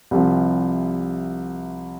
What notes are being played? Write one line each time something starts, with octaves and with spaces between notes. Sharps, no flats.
C2 C3 F3